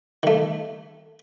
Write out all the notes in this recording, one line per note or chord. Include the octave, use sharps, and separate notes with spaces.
D#3 A3